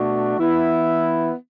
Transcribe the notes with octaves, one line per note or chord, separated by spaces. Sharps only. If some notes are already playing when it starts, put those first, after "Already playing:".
Already playing: B2 A3 D4 F#4
E3 B3 E4